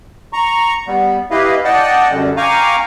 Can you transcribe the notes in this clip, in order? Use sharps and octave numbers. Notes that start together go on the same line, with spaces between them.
A#5 C#6
G3 B3
E4 G4 B4 D#5 F5
D5 D#5 F#5 G5 A5
F#2 D3 G3
F5 G5 G#5 A#5 C#6 D6